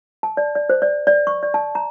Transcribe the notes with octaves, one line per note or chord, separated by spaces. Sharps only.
A5
D5
D5
C5
D5
D5
C#6
D5
A5
A#5